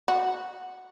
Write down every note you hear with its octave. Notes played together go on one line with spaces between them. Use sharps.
F#4